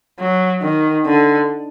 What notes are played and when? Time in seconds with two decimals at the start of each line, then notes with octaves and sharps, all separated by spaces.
0.19 F#3
0.63 D#3
1.06 D3